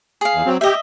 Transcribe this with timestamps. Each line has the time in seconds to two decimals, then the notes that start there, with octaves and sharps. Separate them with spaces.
0.21 G#4 F5
0.33 E2
0.46 F#3 C4
0.61 G4 D#5 E5